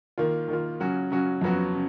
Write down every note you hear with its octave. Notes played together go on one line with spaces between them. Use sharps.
D#3 A#3 F4
D#3 A#3 F4
C#3 F#3 C#4 F#4
C#3 F#3 C#4 F#4
F2 C#3 F#3 B3 F#4
C#3